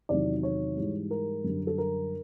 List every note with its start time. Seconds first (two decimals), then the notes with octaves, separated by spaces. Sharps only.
0.09 E2 C3 D#3 F#3 D5
0.43 C#5
0.77 G#2 E3 G3
1.11 A#4
1.44 F#2 D3 G3
1.67 A4
1.78 A#4